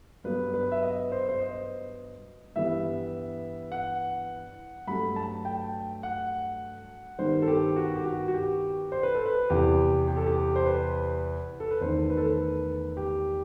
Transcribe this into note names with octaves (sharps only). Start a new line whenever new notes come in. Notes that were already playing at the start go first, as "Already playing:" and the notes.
G2 F#3 B3 B4
B4
E5
D#5
C5
C5
D#5
G2 E3 G3 B3 E5
F#5
G2 F#3 A3 B5
A5
G5
F#5
G2 D#3 G3 B3 C5
A4
G4
F#4
G4
F#4
F#4
G4
C5
B4
A4
B4
E2 C3 E3 G4
G4
A4
G4
C5
B4
A4
B4
E2 D#3 A3 C5
B4
A4
B4
G4